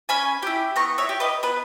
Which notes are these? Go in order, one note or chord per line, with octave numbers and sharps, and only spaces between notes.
C#4 G#5 B5
E4 G4
B3 A#5 C#6
C#5 E5
G4
B4 D#5
B3 B4